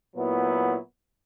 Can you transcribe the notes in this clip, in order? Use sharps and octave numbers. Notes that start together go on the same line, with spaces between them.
A#2 F#3 B3 E4